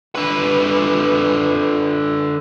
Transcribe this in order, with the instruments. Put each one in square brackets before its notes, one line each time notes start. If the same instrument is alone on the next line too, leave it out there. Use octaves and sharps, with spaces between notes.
[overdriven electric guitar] D3 B4